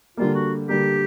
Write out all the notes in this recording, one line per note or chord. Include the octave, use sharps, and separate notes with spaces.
D3 G3 A#3 F4
F#4
D3 G3 A#3 G4